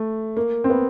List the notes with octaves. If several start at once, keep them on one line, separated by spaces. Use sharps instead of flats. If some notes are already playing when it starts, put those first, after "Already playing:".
Already playing: A3
A#3
C4
B3